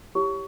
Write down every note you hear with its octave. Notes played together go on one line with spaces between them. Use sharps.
E4 G4 C#5